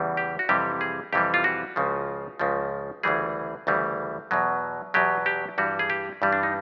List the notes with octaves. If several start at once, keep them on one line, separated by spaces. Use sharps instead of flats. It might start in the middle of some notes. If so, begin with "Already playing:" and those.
Already playing: E2 C#3 E3 G3
G4
F#4
F2 C3 E3 G3 G4
G#4
F2 C3 E3 G3 G4
F4
F#4
C#2 C#3 F3
C#2 C#3 F3
D2 C#3 E3 G3 G#4
D2 C#3 E3 G3
E2 B2 F#3
E2 B2 F#3 G4
G4
G2 E3 G3 F#4
G#4
G4
G2 E3 G3
D4
D#4